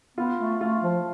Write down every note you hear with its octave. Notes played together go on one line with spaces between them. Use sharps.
B3 F4
A3
A3 F4
F3